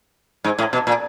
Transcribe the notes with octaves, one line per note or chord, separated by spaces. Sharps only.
G#2
A2
B2
A#2